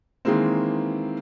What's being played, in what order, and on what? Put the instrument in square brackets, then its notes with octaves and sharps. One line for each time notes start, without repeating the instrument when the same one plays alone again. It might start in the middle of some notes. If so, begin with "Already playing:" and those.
[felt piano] D#3 E3 G#3 A#3 C4